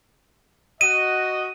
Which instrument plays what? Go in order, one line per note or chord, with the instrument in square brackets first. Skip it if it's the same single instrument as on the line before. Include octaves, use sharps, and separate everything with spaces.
[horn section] F#4 D#5 [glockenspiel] D#7